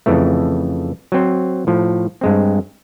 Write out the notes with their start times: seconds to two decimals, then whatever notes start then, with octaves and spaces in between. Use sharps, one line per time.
0.06 F2 C#3 E3 A3
1.12 F#3 C4 C5
1.67 A2 F3
2.21 G2 G#3 C4